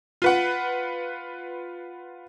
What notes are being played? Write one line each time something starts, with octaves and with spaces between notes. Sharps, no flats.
F4 B4 F#5